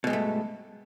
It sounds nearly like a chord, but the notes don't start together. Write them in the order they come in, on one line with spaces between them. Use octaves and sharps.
B2 G#3 G2 A3